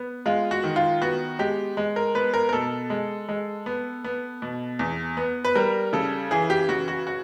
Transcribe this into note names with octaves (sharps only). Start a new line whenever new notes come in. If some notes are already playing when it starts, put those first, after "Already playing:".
Already playing: B3
G#3 F4
F#4
D#3
F4
B3 F#4
G#3 G4
G#3
A#4
B3 B4
A#4
A#4
B2 A4
G#3
G#3
B3
B3
B2
E2
B3
B4
G3 A#4
C#3 A4
E3 G#4
G4
C#3 F#4
F#4
F#4